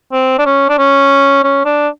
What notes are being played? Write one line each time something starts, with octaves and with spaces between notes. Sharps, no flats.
C4
D4
C#4
D4
C#4
C#4
D4